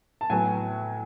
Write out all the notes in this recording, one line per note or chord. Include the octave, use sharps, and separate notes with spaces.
A5
A2 F#3 B3 G#5